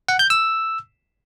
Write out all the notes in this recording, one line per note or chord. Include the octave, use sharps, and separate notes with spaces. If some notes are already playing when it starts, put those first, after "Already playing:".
F#5
G6
E6